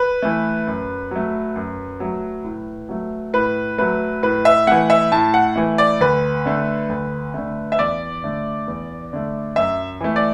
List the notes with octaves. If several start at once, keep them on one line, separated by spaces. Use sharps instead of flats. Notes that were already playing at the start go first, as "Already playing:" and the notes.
Already playing: B4
E3 A3
F#2
F#3 A3
F#2
F#3 A3
A2
F#3 A3
A2 B4
F#3 A3 B4
A2 B4
E5
E3 A3 F#5
E5
A2 A5
F#5
E3 A3
D5
D2 B4
D3 A3
D2
D3 A3
E5
E2 D5
D3 A3
E2
D3 A3
F#2 E5
E3 A3
D5